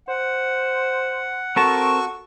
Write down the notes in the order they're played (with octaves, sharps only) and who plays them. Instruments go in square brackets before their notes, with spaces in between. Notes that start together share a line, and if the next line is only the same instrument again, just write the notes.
[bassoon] C5 [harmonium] F#5
[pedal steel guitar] C4 A#4 A5 [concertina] F#4 C#6 [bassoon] A4